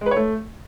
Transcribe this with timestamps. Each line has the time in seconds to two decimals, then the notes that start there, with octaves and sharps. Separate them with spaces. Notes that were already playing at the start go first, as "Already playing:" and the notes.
0.01 G#3
0.06 B4
0.11 C#5
0.16 A3